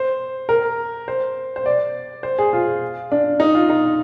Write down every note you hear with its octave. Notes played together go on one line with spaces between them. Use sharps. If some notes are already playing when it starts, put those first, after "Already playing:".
Already playing: C5
A#4
C5
C5
D5
C5
G#4
F4
D4
D#4
F4
D#4